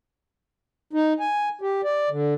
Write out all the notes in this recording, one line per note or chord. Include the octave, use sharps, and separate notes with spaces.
D#4
G#5
G4
D5
D3